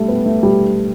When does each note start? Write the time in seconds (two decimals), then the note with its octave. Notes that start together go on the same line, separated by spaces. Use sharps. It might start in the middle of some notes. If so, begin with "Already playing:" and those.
Already playing: G3 A3
0.08 B3
0.26 A3
0.43 G3